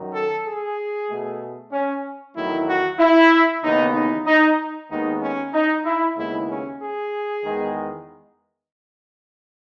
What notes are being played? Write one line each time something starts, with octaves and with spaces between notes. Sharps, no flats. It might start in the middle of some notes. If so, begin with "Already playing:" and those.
Already playing: F#2 D#3 F#3
A4
G#4
B2 A3
C#4
E2 D#3 F#3 A3 E4
F#4
E4
D#2 C#3 E3 B3 D#4
D#4
D#4
D#2 D#3 G#3 B3 D#4
C#4
D#4
E4
D#2 C#3 G#3 B3 E4
C#4
G#4
E2 D#3 G#3 B3